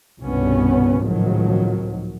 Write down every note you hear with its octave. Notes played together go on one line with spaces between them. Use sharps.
G1 C2 G2 B2 B3 C#4
G#1 C#2 A2 D#3 F3 F#3